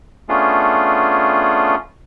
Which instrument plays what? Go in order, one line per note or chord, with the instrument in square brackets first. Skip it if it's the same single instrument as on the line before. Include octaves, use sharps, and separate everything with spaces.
[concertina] A3 B3 C#4 D4 F4 G#4